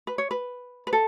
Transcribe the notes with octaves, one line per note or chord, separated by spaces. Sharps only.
B4
C#5
B4
B4
A4